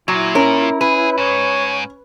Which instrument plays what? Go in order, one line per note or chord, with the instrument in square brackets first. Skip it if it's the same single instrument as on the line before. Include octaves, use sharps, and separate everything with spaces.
[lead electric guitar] A#2 [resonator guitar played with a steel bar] F#3 [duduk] E4
[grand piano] C#4 [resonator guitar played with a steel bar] A#4
[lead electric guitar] G#4 [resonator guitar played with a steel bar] B4
[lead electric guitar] G#2 [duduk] C#5